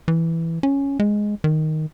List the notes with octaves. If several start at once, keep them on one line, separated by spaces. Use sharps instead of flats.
E3
C#4
G#3
D#3